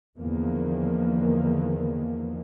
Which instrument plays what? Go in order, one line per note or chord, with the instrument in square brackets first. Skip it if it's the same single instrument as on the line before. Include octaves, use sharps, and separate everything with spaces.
[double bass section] E2 D3 D#3 F3 A#3